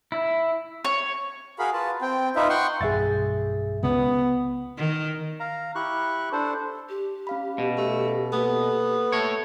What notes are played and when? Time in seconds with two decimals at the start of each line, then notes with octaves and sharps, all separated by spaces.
0.12 E4
0.85 C#5
1.59 F#4 G#4 A#4 F5 B5
1.73 F4 B4 A5
2.02 C4 G5
2.36 D#4 F4 B4 E5
2.49 F#5 G5 C6 C#6
2.81 B1 G2 G#4 E5 A6
3.83 C#2 B3
4.77 D#3
5.40 F5 A#5
5.75 E4 G4 C#6 F#6
6.32 D4 A4 C5
6.89 G4
7.27 C#4 F5 B5
7.58 B2
7.78 A3
8.32 A#3 B3 A4
9.12 A3 C#5